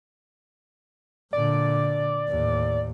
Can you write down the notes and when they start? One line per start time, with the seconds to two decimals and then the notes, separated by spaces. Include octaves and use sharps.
1.33 A#2 D3 D5
2.29 D#2 A2